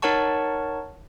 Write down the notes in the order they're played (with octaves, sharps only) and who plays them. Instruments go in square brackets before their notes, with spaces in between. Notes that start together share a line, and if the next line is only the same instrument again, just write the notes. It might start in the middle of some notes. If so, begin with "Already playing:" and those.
[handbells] D#4 A#4 C#5 F#5 A5 C#6